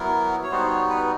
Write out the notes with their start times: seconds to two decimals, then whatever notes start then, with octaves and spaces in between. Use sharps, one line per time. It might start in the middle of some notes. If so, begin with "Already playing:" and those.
Already playing: F#3 B3 E4 A#4
0.43 C#5
0.51 G3 B3 D#4 F#4 C5
0.70 C#5
0.89 B4